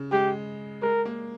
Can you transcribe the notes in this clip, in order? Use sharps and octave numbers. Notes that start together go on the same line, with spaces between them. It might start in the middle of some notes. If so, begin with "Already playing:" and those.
Already playing: C#3
G#3 G4
G#3 A#4
A#3